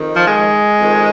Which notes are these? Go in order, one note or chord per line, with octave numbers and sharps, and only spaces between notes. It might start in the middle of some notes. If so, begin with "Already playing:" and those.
Already playing: F2 D#3
F3
G#3
F2 D#3